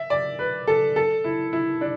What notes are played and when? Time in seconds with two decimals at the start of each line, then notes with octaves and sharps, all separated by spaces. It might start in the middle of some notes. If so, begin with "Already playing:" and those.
Already playing: E5
0.10 D5
0.39 B4
0.67 A4
0.96 A4
1.24 E4
1.53 E4
1.81 D4